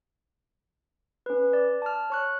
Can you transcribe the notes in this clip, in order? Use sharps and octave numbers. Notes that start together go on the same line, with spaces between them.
C#4 B4
D5
A5 F6
C#5 C#6 F#6